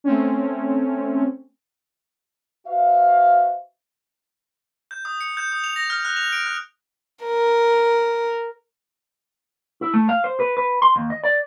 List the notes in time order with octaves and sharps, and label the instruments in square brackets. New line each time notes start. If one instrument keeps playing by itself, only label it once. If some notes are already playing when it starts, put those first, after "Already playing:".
[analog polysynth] A3 C4 C#4
[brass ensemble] F#4 B4 C5 E5 F5
[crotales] G6
D#6
C#7
G6
D#6
F7
A#6
F6
F#6
F7
D7
F#6
[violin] A#4
[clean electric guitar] E4
A3
F5
C5
B4
B4
C6
D#2
D#5
D5